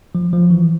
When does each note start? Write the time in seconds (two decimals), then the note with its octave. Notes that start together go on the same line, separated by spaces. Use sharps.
0.15 F3
0.33 F3
0.50 E3